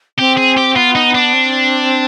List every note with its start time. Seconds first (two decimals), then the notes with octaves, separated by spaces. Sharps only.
0.19 C4 G4
0.38 G#4
0.57 G4
0.76 B3 F4
0.96 D#4
1.15 D4
1.34 C4